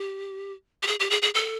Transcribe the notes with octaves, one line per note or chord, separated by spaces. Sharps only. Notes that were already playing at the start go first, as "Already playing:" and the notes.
Already playing: G4
G4
G#4
G4
G#4
G#4
A4